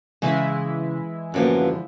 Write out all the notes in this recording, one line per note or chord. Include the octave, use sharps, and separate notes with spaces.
C#3 E3 G#3 E4
F#2 A2 D3 F3 A#3 B3